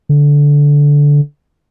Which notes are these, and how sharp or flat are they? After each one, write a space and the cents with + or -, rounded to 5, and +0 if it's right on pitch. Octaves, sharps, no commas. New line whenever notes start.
D3 -15